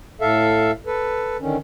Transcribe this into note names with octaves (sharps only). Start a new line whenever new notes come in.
A2 A4 E5 F5
A4 B4
D3 D#3 C#4